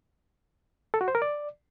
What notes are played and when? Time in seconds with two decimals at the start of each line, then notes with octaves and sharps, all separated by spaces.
0.94 A4
1.01 F#4
1.08 C5
1.15 A#4
1.22 D5